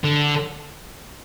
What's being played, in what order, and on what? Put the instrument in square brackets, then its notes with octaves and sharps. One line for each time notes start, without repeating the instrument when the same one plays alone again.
[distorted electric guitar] D3